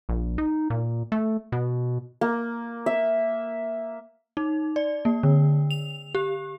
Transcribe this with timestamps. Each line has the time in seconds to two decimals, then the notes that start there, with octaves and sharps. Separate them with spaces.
0.09 A#1
0.38 D#4
0.70 A#2
1.12 A3
1.52 B2
2.21 A#3
2.86 E5
4.37 D#4
4.76 D5
5.05 A#3
5.23 D3
5.71 F7
6.15 G4